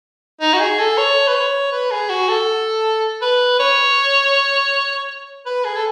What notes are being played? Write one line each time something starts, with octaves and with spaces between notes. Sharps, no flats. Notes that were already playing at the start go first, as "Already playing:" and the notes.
D#4
F#4
G#4
A4
C#5
B4
C#5
B4
G#4
F#4
A4
B4
C#5
B4
G#4
A4